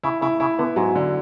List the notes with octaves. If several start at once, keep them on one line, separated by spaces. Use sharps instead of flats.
C#3 E4
C#3 E4
C#3 E4
D3 B3
G#2 F#3
D3